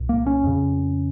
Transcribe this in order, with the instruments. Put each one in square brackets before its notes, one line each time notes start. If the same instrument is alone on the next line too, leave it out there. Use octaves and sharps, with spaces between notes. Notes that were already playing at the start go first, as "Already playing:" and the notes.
Already playing: [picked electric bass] C2 A#2
A#3
C#4
F2 C#3